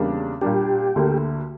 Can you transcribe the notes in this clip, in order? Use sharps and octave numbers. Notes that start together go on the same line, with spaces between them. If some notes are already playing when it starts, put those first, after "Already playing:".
Already playing: E2 C#3 G3 A#3 D4
A#2 G3 A#3 D4 G4
D2 D3 A#3